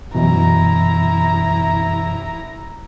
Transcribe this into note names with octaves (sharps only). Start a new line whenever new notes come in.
F#2 B2 E3 E4 A#5